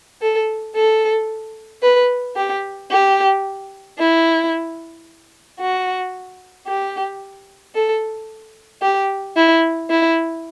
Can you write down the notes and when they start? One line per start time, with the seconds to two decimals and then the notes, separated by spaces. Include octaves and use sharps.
0.22 A4
0.76 A4
1.83 B4
2.36 G4
2.91 G4
3.99 E4
5.60 F#4
6.67 G4
7.75 A4
8.82 G4
9.36 E4
9.90 E4